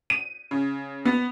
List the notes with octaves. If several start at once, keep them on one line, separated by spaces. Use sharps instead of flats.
D#7
C#3
B3